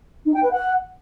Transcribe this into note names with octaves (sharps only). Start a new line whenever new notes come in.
D#4
G5
B4
F#5